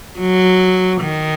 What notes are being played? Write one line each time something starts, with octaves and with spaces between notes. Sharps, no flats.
F#3
D#3